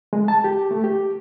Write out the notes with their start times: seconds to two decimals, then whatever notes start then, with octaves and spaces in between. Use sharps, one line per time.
0.13 G#3
0.28 A5
0.44 G4
0.71 A3
0.84 G4